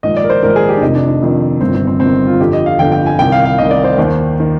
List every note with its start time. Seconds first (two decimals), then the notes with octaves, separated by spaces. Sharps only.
0.03 A#1 G#2 D#3 D#5
0.17 D5
0.24 A#4
0.30 C5
0.43 A#1 G#2 D#3 A#4
0.56 G#4
0.69 G4
0.77 D4
0.82 F1 F2 C3 D#3 D#4
0.95 D4
1.08 D#4
1.22 F1 F2 C3 D#3
1.61 G1 G2 D#3 C4
1.75 C4
1.87 C4
2.00 G1 G2 D#3 C4
2.27 F4
2.40 G1 F2 D3 G4
2.53 D#5
2.66 F5
2.79 G1 F2 D3 G5
2.92 G5
3.06 G#5
3.19 C2 C3 D#3 G5
3.32 F5
3.45 F5
3.58 C2 C3 D#3 D#5
3.71 D5
3.84 C5
3.98 D#2 D#3
4.40 D#3